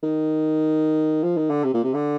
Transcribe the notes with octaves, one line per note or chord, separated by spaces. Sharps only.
D#3
F3
D#3
D3
C3
A#2
C3
D3